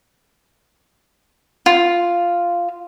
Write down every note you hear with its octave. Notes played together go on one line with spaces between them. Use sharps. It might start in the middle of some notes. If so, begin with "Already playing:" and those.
F4